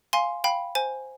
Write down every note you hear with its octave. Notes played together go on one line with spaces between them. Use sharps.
F5 G#5 C6
F5 G5 B5
C5 G#5